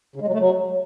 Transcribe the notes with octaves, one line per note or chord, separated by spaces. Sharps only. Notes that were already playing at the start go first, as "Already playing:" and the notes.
C#3
G#3
F#3
A3
F#3